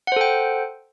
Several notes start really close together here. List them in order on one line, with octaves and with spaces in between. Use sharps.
F#5 C5 A4 G5